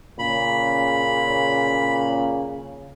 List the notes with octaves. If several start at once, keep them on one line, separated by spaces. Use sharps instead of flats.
A#2 C#3 B5